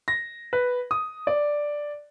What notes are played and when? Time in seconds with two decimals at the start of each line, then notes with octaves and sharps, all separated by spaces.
0.08 A#6
0.53 B4
0.91 D#6
1.27 D5